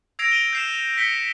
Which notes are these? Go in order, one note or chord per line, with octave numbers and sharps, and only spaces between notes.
E6 G#6 A#6 C7 D7 F7
D#7 F7 G7
G6 C7 E7
G6 B6 C#7 G7